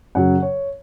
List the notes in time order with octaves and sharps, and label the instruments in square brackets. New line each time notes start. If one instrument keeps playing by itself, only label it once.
[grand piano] F#2 C#3 F#3 F#5
C#5